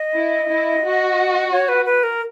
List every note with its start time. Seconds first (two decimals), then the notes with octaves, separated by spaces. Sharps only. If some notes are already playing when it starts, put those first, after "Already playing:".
Already playing: D#5
0.15 E4
0.50 E4
0.84 F#4
1.52 C#5
1.68 B4
1.86 B4
2.03 A#4